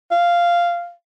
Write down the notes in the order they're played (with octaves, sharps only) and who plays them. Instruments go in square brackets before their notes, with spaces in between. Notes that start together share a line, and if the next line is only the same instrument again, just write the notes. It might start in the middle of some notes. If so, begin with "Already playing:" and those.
[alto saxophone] F5